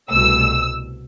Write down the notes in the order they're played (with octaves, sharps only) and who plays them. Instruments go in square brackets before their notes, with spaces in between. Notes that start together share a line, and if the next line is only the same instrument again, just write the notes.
[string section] C2 B2 A3 E6